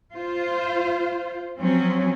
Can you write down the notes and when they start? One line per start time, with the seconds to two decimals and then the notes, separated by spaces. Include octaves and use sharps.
0.14 F4 C5
1.59 F3 F#3 C4 C#4